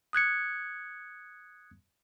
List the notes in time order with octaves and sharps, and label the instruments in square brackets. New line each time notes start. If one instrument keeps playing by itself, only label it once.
[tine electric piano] D#6 F#6 G#6 C#7